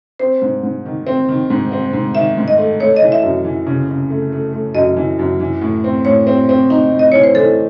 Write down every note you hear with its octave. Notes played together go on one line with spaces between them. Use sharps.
C4 C5
G#2
G#2
D#3
C4
D#3
G#2
C4
G#2
D#3 E5
G#2
D#5
A3
A3 C#5
D#5
E3
E5
F#2
E3
C#3
C#3
A3
A3
A3
F#2 D#5
E3
F#2
E3
A2
C4
A2 C#5
C4
C4
D#4
A2
D#5
E3 C#5
C5
E3 A4